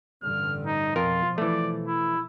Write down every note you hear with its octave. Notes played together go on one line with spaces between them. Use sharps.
A1 G2 D3 F6
D#4
F2 B2 F3 F4 A#4
E3 A3 D5
E4